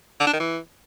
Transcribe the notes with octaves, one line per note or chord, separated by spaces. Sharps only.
D3
D4
D#3
E3